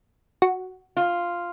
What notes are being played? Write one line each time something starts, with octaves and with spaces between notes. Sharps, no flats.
F#4
F4